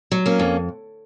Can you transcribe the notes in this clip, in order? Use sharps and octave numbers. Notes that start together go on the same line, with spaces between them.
F#3
A#3 C#4
F2